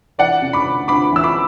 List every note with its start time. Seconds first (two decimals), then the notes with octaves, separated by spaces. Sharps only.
0.18 E3 D5 F#5
0.42 C#3
0.53 B5 D6
0.65 D2
0.88 D2 B5 D6
1.12 E3 E6
1.24 B5 D6